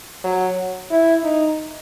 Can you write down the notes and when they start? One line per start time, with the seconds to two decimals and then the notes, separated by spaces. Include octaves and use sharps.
0.24 F#3
0.91 E4
1.24 D#4